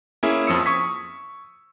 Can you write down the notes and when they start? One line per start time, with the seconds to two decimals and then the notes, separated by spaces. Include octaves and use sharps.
0.23 A#3 C#4 E4 G#4 E5
0.47 F2 F3 D#6 E6 C#7
0.66 C#6 D#6 G#6 B6